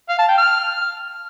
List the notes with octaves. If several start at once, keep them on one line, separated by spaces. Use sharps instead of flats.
F5
A5
G5
F6